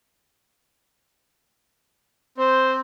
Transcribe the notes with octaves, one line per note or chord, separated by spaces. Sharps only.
C4 C5